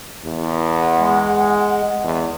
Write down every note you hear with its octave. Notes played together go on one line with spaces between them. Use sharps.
E2
F#5
G#3
E2